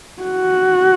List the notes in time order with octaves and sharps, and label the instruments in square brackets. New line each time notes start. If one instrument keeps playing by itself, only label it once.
[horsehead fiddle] F#4